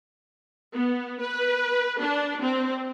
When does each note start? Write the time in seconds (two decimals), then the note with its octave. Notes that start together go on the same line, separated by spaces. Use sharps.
0.74 B3
1.22 B4
2.02 D4
2.42 C4